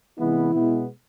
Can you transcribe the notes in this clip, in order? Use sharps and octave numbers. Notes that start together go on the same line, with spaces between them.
C3 E3 G#3 B3 E4
B2 G#3 B3